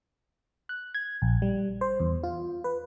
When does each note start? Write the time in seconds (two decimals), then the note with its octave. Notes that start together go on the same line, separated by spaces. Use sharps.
0.69 F#6
0.94 G#6
1.22 A#1
1.42 G3
1.81 C5
2.00 E2
2.24 F4
2.64 B4